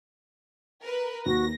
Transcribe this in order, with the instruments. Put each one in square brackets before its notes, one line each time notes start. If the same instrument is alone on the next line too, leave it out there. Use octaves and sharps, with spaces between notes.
[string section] A#4 B4
[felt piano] D#2 [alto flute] F#4 [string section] A#6